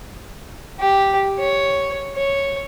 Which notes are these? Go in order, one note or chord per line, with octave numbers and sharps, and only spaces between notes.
G4
C#5
C#5